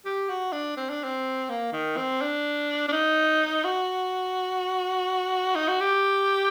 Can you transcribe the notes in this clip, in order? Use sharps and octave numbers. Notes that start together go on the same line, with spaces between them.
G4
F#4
D4
C4
D4
C4
A#3
D#3
C4
D4
D4
D#4
F#4
D#4
F#4
G4